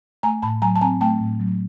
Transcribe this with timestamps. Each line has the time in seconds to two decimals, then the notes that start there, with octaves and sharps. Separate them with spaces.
0.23 A3 G#5 A#5
0.42 A2 A5 B5
0.62 F#3 G#5 A#5
0.76 A5
0.81 C4 G#5 A#5
1.01 A3 G5 A5
1.20 A2
1.40 F#3